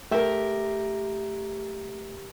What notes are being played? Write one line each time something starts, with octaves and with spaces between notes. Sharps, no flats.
A3 G4 A#4 E5